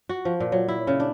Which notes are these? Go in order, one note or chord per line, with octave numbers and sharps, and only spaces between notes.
F#4
F3
A#2
F#3
E4
C#3
D4